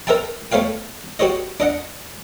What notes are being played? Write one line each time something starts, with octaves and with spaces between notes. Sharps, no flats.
A#4 C5 E5 G5 A5
A3 C5 C#5 F5 G5
F#4 G4 C5 C#5 D#5
D4 D#5 F#5